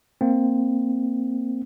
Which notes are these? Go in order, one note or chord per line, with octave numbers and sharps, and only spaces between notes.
A#3 C4